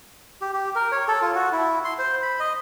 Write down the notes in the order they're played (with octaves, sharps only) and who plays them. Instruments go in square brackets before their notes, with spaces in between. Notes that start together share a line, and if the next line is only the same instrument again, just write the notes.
[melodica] G4
G4
A#4
C#5
A4
F4
F#4
E4
C6
C5
B5
D#5